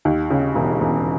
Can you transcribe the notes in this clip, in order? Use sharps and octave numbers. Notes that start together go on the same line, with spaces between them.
D#2
C#3
E1
E1